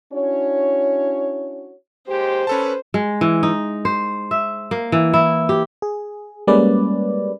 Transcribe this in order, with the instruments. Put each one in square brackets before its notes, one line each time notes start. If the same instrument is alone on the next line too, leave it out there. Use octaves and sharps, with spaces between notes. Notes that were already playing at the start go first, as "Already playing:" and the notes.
[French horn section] C#4 D4 E4 F#4 C#5
[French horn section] D#2 G#3 G4 [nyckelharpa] C5
[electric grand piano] C#4 A4 A5 [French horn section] B4
[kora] G#3
E3
D#4
C5
E5
A#3
E3
E4
G4
[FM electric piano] G#4
G3 G#3 A#3 C#4 B4 D5